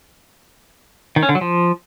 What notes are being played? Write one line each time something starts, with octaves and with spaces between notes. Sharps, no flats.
D#3
C#4
D3
F#3
F3